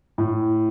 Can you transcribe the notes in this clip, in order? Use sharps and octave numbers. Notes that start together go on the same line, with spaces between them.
A2